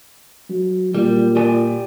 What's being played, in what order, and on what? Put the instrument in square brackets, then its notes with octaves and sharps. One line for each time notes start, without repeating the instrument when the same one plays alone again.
[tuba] F#3
[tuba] A#2 [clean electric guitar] G3
[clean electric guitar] G4 D5 G#5